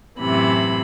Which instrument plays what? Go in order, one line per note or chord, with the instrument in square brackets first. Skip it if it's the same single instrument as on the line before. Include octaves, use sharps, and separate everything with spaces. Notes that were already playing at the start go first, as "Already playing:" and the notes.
[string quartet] F#2 A2 C3 E3 B5